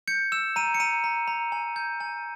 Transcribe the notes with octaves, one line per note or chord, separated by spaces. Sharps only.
G6 C#7
E6 E7
A#5 D#7
C#7
A#5 D#7
A#5
A#5
G#5
G6
G#5